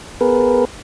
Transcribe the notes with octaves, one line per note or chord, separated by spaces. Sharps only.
B3 G#4 A#4 B4